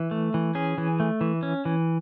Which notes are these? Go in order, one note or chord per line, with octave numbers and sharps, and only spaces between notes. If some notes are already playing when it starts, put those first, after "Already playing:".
Already playing: E3
A3
E3
C#4 G#4
E3
A3
E3
C#4
E3